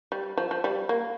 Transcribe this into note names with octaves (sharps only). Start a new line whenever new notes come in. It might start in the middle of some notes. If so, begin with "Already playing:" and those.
G3
F3
F3
G3
A#3